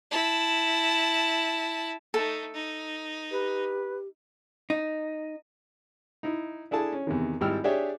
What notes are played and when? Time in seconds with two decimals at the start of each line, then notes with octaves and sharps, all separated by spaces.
0.11 E4 A5
2.14 A3 D#4 A4
2.54 D#4
3.31 G4 B4
4.70 D#4
6.23 D#4 E4
6.71 D4 E4 G#4 A4 A5
6.92 C#4
7.07 E2 C3 D#3
7.41 G#1 G3 E4 G5 E6 F6
7.64 D4 G4 G#4 C#5 D5 E5